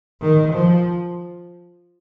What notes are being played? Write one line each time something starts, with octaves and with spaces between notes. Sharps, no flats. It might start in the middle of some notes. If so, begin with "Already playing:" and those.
D#3
F3